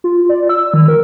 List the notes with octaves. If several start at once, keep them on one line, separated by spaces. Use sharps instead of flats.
F4
D5
E6
D#3
A#4